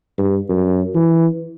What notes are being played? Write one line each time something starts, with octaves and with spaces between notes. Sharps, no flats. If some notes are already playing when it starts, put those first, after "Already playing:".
G2
F#2
E3